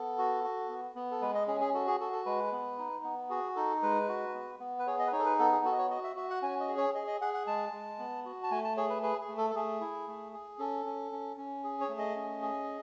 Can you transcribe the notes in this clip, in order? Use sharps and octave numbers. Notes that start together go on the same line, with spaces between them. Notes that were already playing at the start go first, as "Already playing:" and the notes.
Already playing: B3 A4
F#4
F#4
B3
B3
A4
G#3 B4
D#5
C#4 G#4
G#4
F#4 A4
G#4
F#4 A4
A4
G#3 B4
B3
D#4
B3
F#4 G#4
D#4 A4
G#3 B4
F#4
B3
B3
B4
G#4 C#5
D#5
B4
D#4 C#5
A4
B4
B3 A4
G#4
F#4 A4
D#5
C#5
F#4 D#5
E5
F#4 E5
F#5
C#4 G#5
D#5
G#4
C#5
G#4 D#5
D#5
G#4 F#5
F#5
G#3 A5
G#3
B3
F#4
A5
A3 G#5
A5
G#4 C#5
B4
G#4 B4
G#4
A3
A4
A4
A3 G#4
E4
A3
G#4
C#4 A4
C#4
C#4
C#4
G#4
C#5
A3
D#5
C#4
G#4